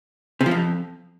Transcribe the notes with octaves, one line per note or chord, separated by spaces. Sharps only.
C3
F3
F2